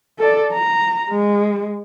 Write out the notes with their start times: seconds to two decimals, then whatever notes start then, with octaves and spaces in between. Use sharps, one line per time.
0.19 A4 D5
0.53 A#5
1.10 G#3